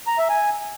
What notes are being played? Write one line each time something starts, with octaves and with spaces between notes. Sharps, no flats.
A#5
E5
G#5